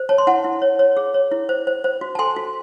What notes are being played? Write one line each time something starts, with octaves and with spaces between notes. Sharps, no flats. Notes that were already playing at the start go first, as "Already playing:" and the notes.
Already playing: C5
C#5 A5
C6
E4 F#5 A5
E4
C#5
C#5
G#4
C#5
E4
C5
C5
C5
F#4
A5
A4 G#5 C6
F#4